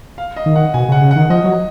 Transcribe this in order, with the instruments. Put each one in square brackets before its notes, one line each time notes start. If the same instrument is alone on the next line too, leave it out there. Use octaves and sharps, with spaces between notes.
[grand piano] F5
D#5
[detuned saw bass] D#3
[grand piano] F#5
[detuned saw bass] B2 [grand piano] G#5
[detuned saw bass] C#3 [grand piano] F#5
[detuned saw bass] C#3
[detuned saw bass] D#3 [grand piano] F#5
[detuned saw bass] F3 [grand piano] D#5
[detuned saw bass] F#3